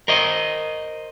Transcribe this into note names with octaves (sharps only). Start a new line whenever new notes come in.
A#4 C5 D#5